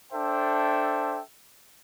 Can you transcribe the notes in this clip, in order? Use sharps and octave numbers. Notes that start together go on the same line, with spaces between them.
D4 A4 C5 E5 G5